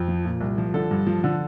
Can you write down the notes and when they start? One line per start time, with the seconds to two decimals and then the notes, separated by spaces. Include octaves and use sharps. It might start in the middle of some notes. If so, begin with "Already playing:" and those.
Already playing: F2
0.08 F3
0.25 A#2
0.41 C2
0.58 F3
0.74 D3 A4
0.91 G2
1.07 F3
1.24 D3